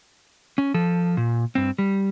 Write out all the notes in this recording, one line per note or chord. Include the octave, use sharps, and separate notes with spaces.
C#4
F3 A4
A#2
G2 C4
G3